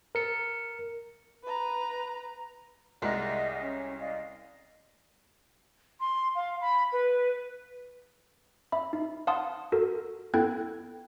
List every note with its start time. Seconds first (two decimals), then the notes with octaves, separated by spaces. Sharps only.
0.15 A#4 C#7
1.44 B4 A#5
3.02 C2 G#3 A#4 D5 D#5 F#5
3.61 C#4
3.99 D5 D#5 F5
6.00 C6
6.35 F5
6.61 B5
6.92 B4
8.72 E5 B5
8.93 D#4
9.27 F5 F#5 A5 C6 D#6
9.72 F#4 A4 A#4
10.34 B3 E4 A4 G5 F#6 G#6